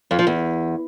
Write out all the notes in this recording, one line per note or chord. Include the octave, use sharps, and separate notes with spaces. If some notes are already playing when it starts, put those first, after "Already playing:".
F2
F3
E2